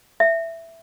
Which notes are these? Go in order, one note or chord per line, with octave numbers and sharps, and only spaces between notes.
E5